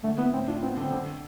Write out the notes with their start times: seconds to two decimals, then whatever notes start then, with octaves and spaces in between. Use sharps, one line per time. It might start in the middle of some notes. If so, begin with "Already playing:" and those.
0.04 D3 A3
0.18 B3 E4
0.33 A2 C4
0.48 D4 F4
0.63 B3 C4
0.77 D3 C4
0.92 D3